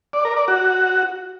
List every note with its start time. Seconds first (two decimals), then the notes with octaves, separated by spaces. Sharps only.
0.13 D5
0.25 A#4
0.36 D5
0.48 F#4